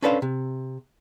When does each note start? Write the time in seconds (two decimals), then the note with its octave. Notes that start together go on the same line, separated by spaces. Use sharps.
0.02 C#4 D4 A4 B4 C5 F5
0.22 C3